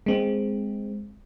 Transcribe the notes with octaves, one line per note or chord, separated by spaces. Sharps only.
G#3 C4